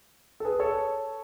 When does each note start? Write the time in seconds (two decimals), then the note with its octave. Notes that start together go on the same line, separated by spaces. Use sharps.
0.40 A4
0.45 G#4 B4
0.60 A4 C#5